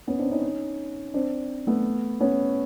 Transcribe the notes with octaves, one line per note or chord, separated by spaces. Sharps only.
B3 C#4
C4 D4
C#4 D#4
C4 D4
A3 B3
B3 C#4